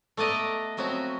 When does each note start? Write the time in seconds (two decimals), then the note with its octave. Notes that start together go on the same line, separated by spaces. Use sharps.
0.17 A3 B3 D5 D#5 A#5
0.77 F3 F#3 B3 C4 F#4